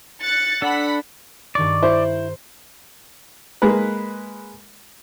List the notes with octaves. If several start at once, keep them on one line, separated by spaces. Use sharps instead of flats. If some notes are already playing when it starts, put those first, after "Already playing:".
F#6 A6 C#7
D4 A4 F#5 B5 B6
G2 D#3 D5 C#6
E4 C5
G#3 A#3 B4